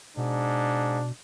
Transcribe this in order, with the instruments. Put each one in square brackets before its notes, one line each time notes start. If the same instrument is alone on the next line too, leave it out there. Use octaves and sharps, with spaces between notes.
[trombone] G#2 [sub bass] B2 [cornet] D4